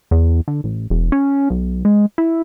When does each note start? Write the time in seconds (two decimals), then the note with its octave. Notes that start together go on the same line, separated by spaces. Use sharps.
0.11 E2
0.48 D3
0.64 A1
0.90 E1
1.12 C#4
1.50 B1
1.85 G#3
2.18 E4